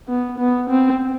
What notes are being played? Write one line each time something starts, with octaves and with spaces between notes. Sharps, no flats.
B3
B3
C4